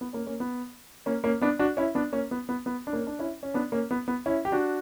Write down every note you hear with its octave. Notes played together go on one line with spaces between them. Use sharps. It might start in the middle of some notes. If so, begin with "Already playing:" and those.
B3
A#3 C#4
A#3 C#4
B3
A#3 C#4
A#3 C#4
B3 D4
D4 F#4
C#4 E4
B3 D4
A#3 C#4
B3
B3
B3
D4
A#3 C#4
D4
C#4 E4
C#4
B3 D4
A#3 C#4
B3
B3
C#4 E4
G4
D4 F#4